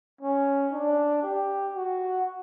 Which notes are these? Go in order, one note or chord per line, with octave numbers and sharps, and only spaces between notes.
C#4
D4
G4
F#4